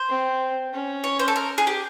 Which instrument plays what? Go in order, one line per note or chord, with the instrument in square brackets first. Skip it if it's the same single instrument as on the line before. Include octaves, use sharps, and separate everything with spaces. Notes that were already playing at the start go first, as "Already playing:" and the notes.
Already playing: [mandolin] C5
[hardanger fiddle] C4
C#4
[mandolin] C#5
C5
A4
A#4
G#4
G4